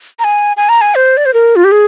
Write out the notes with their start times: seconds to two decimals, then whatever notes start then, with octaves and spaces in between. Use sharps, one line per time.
0.19 A#5
0.24 G#5
0.57 G#5
0.69 A#5
0.81 G#5
0.95 C5
1.17 D5
1.26 C5
1.34 A#4
1.56 F4
1.64 G4
1.72 G#4